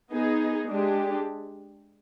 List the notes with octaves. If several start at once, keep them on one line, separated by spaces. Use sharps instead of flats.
B3 D#4 G#4
G#3 D4 G4